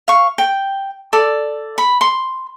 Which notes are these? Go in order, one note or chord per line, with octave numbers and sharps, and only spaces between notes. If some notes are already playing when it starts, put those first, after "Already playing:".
F5 C#6
G5
A4 D5
B5
C6